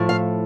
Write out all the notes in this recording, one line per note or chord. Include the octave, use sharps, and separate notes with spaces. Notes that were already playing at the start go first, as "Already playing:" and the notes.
Already playing: A2 F3 A3
F5